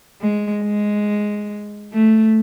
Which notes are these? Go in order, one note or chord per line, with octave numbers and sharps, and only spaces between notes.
G#3
G#3
A3